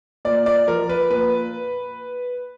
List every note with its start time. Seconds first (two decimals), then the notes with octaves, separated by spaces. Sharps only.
0.25 A#2 D5
0.46 D5
0.67 F3 A#4
0.89 B4
1.11 A#2 B4